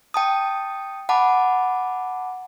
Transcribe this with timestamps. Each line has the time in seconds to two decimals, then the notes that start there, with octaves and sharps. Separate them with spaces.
0.14 G5 A5 D#6
1.09 F#5 A5 B5 D6